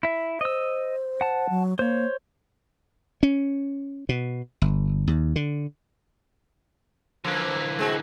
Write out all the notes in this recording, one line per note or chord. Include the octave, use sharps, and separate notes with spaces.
E4 E5
C5 D#5 E6
F#5 A5
F#3
A#3 C5 C#5
C#4
B2
G1
D#2
D3
D3 E3 F3 A#3
G#3 C4 F#4